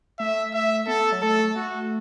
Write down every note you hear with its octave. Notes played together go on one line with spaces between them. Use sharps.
A3 E5
E5
B3 A4
A3
F#3
A3 A4
A3 F#4